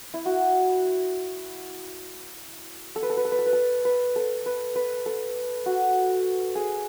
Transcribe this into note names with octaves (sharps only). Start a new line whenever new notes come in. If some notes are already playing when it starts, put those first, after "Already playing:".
E4
F#4
A4
B4
A4
B4
A4
B4
A4
B4
A4
B4
A4
B4
B4
A4
F#4
G#4